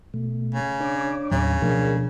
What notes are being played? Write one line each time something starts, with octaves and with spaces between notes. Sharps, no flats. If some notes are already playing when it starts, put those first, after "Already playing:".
B2 A3
C#3
D4 C#5 D6
D#2 A2 C#3 F#3
B2 F3 A3 D4 G#4 A#4